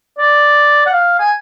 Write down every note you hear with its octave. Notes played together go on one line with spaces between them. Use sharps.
D5
F#5
F5
G#5